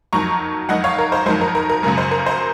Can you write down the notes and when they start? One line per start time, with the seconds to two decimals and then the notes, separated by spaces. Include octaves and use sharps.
0.13 F2 D#3 F#3 A#5 C#6
0.69 F2 D#3 F#3 D#5 F#5
0.84 C#5 F5
0.98 A#4
1.12 C5
1.26 F2 D#3 F#3 C5
1.41 A#4
1.55 A#4
1.69 A#4
1.83 F#2 C#3 F#3 A#4
1.98 C5
2.11 A#4
2.26 C5